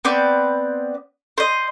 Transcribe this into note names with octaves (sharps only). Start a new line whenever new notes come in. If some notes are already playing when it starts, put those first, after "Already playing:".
B3 C4 D5
C5 D#5